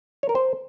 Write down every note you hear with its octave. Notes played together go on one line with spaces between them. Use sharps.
C#5
A#4
C5